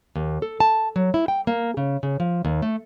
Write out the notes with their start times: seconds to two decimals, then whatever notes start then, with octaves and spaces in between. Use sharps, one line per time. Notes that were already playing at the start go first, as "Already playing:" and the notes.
0.16 D#2
0.42 A4
0.60 A5
0.96 F#3
1.14 E4
1.28 G5
1.47 A#3
1.77 C#3
2.03 C#3
2.20 F3
2.45 D#2
2.62 A3